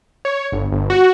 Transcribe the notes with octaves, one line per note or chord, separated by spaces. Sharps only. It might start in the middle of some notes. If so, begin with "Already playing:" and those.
C#5
G1
G1
F#4